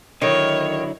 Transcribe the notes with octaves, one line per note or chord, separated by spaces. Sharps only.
D3 D#3 F#3 E4 C#5